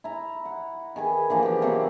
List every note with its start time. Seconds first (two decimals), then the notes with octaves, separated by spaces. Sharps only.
0.04 E4 A#5
0.45 F#5
0.96 D#3 G#4 B4
1.30 D3 E3 F3 A#3
1.43 B3 G4
1.62 C3 F#3 A#3 C4